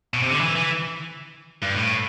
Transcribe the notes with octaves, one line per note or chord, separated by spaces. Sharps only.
B2
C3
D3
E3
E3
G2
A2